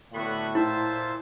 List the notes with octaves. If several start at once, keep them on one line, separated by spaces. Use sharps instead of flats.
A2 D3 B3 F#4 B5 C#6
A#2 E4 C5 E5 A5